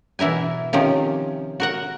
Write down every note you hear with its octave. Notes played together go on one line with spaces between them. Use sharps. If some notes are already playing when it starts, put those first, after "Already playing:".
B2 E3 E4 A#4 G#5
C3 D#3 F3 C#4
F#4 A#4 F#5